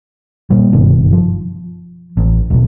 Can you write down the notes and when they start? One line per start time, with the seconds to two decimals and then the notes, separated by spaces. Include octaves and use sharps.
0.50 A#2 G3
0.73 F#1 G2 B2 D#3
1.13 F3
2.17 A1
2.50 D#1 B1